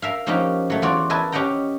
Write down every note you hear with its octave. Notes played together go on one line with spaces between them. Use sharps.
A#4 E5 F5
F3 A#3 C#4 D#4 F#4 G4
F#3 A3
E2 F4 F#4 D5
A#4 B4 D#5 E5 G#5 A5
C#4 G4 D#5 F#5 G5 A#5